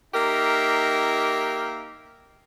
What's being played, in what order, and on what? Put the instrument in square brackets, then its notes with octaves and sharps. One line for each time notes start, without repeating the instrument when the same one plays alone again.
[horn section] A#3 D#4 G4 A#4 E5